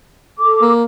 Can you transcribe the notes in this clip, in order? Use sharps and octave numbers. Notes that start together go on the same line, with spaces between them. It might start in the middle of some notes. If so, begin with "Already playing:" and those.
A4 D6
A#3